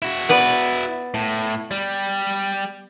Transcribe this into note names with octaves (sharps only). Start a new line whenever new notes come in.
E4 F#4
B3 B4 D5
A2
G3